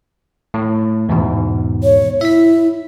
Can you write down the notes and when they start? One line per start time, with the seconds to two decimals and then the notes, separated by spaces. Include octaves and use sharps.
0.54 A2
1.09 E2 G#2 B2
1.83 C#5
2.21 E4 E5 B6